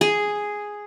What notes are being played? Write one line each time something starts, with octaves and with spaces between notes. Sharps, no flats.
G#4